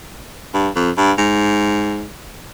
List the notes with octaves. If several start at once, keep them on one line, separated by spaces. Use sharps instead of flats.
G2
F2
G2
G#2